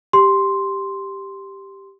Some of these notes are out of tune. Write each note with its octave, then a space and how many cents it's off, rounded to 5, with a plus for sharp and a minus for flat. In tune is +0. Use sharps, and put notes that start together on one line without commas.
G4 +0 C6 +0